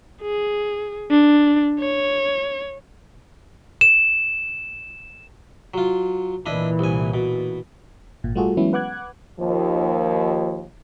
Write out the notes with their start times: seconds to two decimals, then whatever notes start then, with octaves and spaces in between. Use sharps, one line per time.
0.22 G#4
1.11 D4
1.80 C#5
3.81 E7
5.74 F#3 F4
6.46 A#2 E3 D4 E4 D#5
6.79 C2 G#5
7.14 B2
8.24 G#1 A#2
8.35 G3 A3 F4 F#4 G#4 A4
8.57 E3 F#3 G#3 B3 C#4 E4
8.73 B4 F#5 D6 F#6 G#6
9.39 D#2 F3